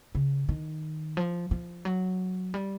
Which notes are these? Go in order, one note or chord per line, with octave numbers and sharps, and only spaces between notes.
C#3
D#3
F3
F3
F#3
G3